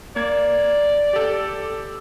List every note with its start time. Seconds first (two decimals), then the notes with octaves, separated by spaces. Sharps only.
0.16 A#3 D5 G#6
1.13 G4 A4